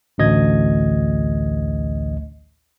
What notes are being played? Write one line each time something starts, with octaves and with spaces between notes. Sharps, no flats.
A1 D2 D#5 G#6